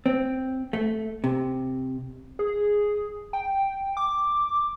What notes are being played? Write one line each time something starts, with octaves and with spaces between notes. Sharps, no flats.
C4
A3
C3
G#4
G5
D6